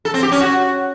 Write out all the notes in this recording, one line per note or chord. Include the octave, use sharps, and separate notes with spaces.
A4
C4
G4
C#4
F#4